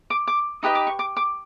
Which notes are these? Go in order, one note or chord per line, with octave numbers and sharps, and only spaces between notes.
D6
D6
D#4 G4 B4 D#5 D#6
D6
C#6
D6
D6